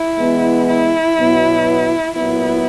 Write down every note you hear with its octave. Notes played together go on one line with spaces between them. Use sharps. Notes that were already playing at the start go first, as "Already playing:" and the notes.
Already playing: E4
E3 G#3 B3
E4
B2 F#3 B3
A#2 F#3 B3 E4